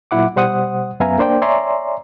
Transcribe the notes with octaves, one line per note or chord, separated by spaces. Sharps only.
A#2 F#3 E4 F#5 D6
B2 G3 C5 F#5 D#6
F#2 B3 E5 F5 G#5 A#5
A#3 D4 C5 D5 G5
C#5 D5 E5 G#5 A#5 C6